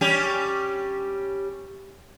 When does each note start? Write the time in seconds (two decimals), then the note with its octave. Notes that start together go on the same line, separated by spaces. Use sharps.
0.01 G3 C#4 G4